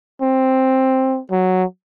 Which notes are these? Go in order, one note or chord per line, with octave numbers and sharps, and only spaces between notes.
C4
F#3